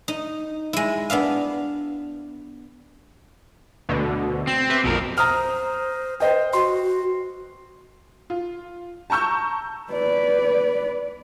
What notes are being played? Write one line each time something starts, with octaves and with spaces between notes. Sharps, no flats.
D#4
G#3 E4
B3 D4 E5 F5
D2 B2 D3
C4 C7
G4 B4 E5
A#1 F2 B2 A#4
C5 A#5 D#6 F6
B4 C5 D#5 G5
F#4 C6
F4
A5 A#5 C#6 E6 G6
B4 D5